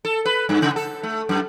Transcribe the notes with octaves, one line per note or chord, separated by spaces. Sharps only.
A4
B4
G2
C#3
A4
A3
F#2